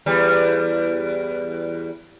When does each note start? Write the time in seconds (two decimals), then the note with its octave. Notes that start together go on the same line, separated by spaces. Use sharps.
0.06 E2 G3